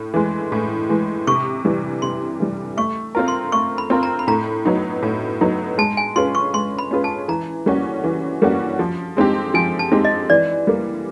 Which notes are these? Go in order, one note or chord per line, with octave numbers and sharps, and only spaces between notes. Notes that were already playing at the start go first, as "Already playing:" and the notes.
Already playing: A2
E3 G#3
A2
E3 G#3
C3 C#6
E3 G3
C3 C6
E3 G3
A3 C#6
C4 F4 A#4
C6
A3 C#6
B5
C4 F4 A#4
A#5
B5
A2 A#5
F#3 B3 D#4
A2
F#3 B3 D#4
G#3 A5
G#5
C#4 F4 G#4 B4 C6
C#6
G#3 C6
B5
C#4 F4 G#4 B4
A5
E3 A#5
G3 A#3 C#4 F#4
E3
G3 A#3 C#4 F#4
F3
G#3 C4 D#4 G4
F3 G#5
A5
G#3 C4 D#4 G4
D#5
E3 D5
G3 A#3